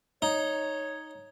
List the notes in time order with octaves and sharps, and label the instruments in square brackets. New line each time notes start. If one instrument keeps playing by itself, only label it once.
[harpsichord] D#4 [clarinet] C#5